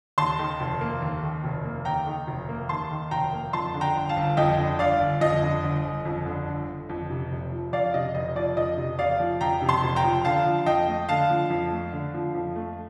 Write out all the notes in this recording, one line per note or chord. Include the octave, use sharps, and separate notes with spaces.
D#2 A5 C6
D#3
F1
A#3
D#2
D#3
F1
A#3
D#2 G5 A#5
D#3
F1
A#3
D#2 A5 C6
D#3
F1 G5 A#5
A#3
F2 A5 C6
D3
G5 A#5
G1
F5 A5
G1
F2 D#5 G5
D3
G1 D5 F5
G1
F2 D#5
D3
G1
G1
F2
D3
G1
G1
F2
C3
F1
F3
F2 D5 F5
C3 D#5
F1 D#5
F3 D5
F2 D#5
C3
F1 D5 F5
F3
F2 G5 A#5
C3
A5 C6
F1
G5 A#5
F3
D3 F5 A5
F3
F2 D#5 G5
A3
D3 F5 A5
F3
F2
A3
D3
F3
F2
A3